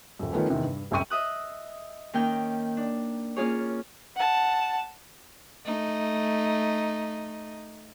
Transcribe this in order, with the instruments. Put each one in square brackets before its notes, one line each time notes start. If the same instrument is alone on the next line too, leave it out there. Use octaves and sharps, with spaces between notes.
[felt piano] D#1 F#2
D#3 F3 A3 B3 C#4
E2 C3 D#3
G2
F#1 C2 F#2 G5 C#6 D#7
[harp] D#5 E5 D#6 F#6
D#3 A#3 C#4 G5
D4
A#3 C#4 F4 G#4 C#5
[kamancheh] F#5 A5
[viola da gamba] A3 D#4